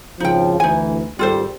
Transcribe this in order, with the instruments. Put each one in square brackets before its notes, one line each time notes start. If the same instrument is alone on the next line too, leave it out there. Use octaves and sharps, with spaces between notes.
[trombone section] G#1 C#3 F3 [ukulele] D#4 G5
[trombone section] D2 E3 [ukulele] D#4 G#5
[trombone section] G#1 G3 [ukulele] F4 A4 C5